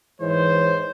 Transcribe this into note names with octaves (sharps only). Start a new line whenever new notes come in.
G#2 E3 C5 C#5